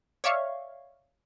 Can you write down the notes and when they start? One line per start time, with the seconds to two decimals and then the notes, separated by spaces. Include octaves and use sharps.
0.24 C#5 D5 E5 F5 C#6